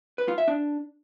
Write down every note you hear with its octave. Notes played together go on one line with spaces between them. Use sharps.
B4
F4
E5
D4